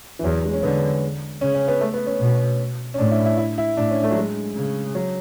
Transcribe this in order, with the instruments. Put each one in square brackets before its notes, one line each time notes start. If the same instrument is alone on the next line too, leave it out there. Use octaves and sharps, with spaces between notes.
[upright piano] E3
[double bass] E2 [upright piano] F#3
[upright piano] G#3
C#4
[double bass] D3 [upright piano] B3
[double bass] C#3 [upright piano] C#4
[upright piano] C#4
B3
A3
B3
C#4
[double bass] B2
[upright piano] C#4
[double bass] A2 [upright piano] D4
[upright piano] E4
E4
E4
E4
[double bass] A2 [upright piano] D4
[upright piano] C#4
A3
F#3
G#3
[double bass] C#3
[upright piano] F#3